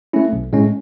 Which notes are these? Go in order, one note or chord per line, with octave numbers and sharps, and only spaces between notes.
A3 C#4 E4
B1
A2 G#3 C#4